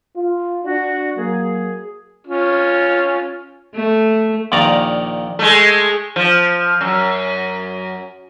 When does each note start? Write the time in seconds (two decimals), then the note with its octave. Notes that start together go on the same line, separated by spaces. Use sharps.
0.16 F4
0.64 D4 F#4
1.17 F#3 A#3 G#4
2.27 C#4 F4
3.74 A3
4.52 A#1 A#2 D#3 D5 A#5
5.39 G#3 A3
6.16 F3
6.81 F#2